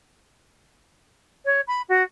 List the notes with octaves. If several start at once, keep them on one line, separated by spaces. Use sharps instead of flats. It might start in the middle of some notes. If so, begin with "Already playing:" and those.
C#5
B5
F#4